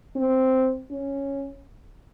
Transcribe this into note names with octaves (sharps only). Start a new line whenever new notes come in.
C4
C#4